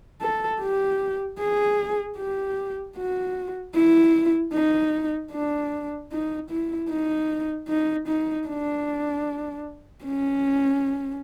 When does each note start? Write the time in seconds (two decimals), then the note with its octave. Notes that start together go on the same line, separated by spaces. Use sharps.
0.21 A4
0.60 G4
1.39 G#4
2.18 G4
2.97 F#4
3.75 E4
4.53 D#4
5.32 D4
6.12 D#4
6.50 E4
6.89 D#4
7.68 D#4
8.07 D#4
8.47 D4
10.04 C#4